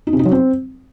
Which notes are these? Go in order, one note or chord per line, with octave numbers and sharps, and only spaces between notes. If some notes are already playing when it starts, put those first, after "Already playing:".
D#4
C3
D#4
F#3
C4